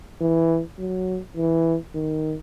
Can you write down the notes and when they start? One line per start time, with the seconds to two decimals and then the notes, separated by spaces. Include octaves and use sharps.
0.21 E3
0.78 F#3
1.36 E3
1.95 D#3